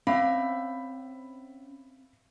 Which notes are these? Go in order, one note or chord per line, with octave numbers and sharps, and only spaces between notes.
C4 C#4 E5 F5 B5